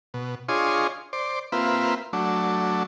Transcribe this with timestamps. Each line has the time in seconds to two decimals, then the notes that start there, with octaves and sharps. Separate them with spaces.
0.14 B2
0.49 D4 F4 G#4 C#5 D#5 C6
1.13 C5 D5
1.52 A#3 C4 F4 B4 E5
2.13 F#3 A3 D4